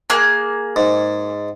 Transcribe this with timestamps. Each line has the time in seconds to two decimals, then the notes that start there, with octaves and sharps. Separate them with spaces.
0.10 A#3 G#4 F#6
0.76 G#2